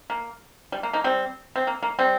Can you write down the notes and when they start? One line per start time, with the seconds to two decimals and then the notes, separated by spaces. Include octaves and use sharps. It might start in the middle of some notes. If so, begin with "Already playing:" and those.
0.10 A#3
0.72 G3
0.83 A#3
0.93 A#3 D#4
1.04 G3 C4
1.56 C4
1.67 A#3
1.83 A#3
1.99 G3 C4